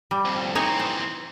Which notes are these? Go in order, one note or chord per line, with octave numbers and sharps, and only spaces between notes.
G3
C2 F2
E3 C4 D#4 C#5 G#5
C5